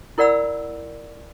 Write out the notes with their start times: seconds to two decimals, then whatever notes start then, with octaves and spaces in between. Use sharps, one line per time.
0.18 E4 A#4 D5 F#5 B5 E6